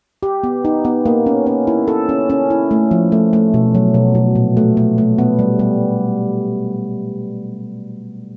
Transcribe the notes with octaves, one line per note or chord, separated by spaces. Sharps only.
G4
B3
D#4
B3
A#3
C#4
C#4
E4
A4
C#4
C#4
E4
A3
F3
A3
A3
B2
F#3
B2
B2
A#2
A3
A3
A3
B3
G3
G3